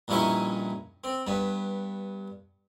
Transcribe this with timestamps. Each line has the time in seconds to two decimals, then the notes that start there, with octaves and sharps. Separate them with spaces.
0.08 A#1 G2 C#4 D#4 E4 C#6
1.04 C4
1.27 G2 B3